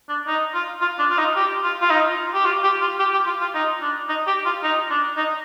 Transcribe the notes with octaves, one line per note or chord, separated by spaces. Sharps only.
D4
D#4
F4
F4
D4
F4
D#4
G4
F4
F4
D#4
G4
F4
G4
F4
G4
G4
F4
F4
D#4
D4
D#4
G4
F4
D#4
D4
D#4